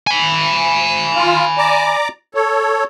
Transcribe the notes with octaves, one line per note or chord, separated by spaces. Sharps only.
G#5 B5
F4
D5 A#5 D6
A4 C#5